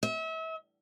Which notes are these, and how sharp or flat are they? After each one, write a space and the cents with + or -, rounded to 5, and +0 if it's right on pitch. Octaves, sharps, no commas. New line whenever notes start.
E5 -35